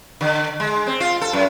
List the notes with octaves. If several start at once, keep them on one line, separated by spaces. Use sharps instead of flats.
D3
G#3
C4
F4
A4
F#2